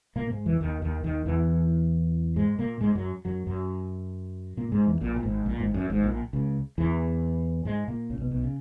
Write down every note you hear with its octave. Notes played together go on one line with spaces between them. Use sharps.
A#2 A#3
G#2 G#3
E2 E3
D#2 D#3
D#2 D#3
D#2 D#3
E2 E3
G#2 G#3
A#2 A#3
G#2 G#3
F#2 F#3
F#2 F#3
F#2 F#3
A#2 A#3
G#2 G#3
E2 E3
A#1 A#2
A#2
G#1 G#2
A#1 A#2
G#1 G#2
F#2
G#1 G#2
A#1 A#2
C#2 C#3
E2 E3
G#2 G#3
A#2 A#3
C#2 C#3
B1 B2
B1 B2
C#3